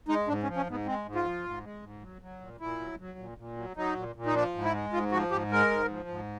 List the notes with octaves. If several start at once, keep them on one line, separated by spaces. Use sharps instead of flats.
G#3 D#4
G#2 D4
C#4
F3
C#4
G#2 B3
G#3 C4
G#2
F4
F3
G#2
G#3
G#2
F#3
F#3
A#2
A#2 E4
F#3
F#3
A#2
A#2
F#3
F#3 D#4
A#2
A#2
D#4
F3 D4
G#2
E4
G#3
G#2 F4
F3 F#4
G#2 G4
G#3 A#4
G#2
F3
G#2